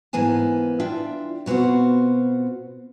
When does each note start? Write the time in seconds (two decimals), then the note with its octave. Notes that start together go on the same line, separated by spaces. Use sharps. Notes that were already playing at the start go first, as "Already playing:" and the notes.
0.13 G#2 E3 A#3 B3 G#5 A5
0.80 E3 D4 F4 E5 G5
1.46 B2 B3 C4 F4 F#4